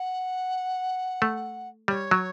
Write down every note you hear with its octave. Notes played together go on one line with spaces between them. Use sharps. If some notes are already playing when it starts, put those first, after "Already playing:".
Already playing: F#5
A3
G3 C#5
F#3